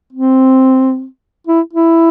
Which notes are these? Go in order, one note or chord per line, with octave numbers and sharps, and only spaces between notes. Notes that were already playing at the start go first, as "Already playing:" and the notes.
C4
E4
E4